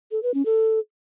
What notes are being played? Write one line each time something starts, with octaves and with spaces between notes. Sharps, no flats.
A4
B4
C#4
A4